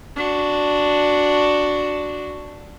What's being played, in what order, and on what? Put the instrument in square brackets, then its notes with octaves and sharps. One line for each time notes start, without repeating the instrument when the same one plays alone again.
[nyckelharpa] D4 F#4